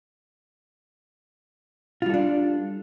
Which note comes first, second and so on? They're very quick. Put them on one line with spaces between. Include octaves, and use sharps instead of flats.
F4 G3 A4 D4